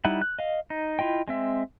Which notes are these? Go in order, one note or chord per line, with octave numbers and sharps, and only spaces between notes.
G3 D#4 E4 F#5
F#6
D#5 F5
D#4
E4 F4 D#5 G5
G#3 C4 E5